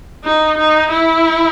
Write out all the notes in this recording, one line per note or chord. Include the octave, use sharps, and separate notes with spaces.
D#4
D#4
E4